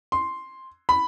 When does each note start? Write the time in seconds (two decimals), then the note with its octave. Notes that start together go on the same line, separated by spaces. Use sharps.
0.12 C6
0.89 B5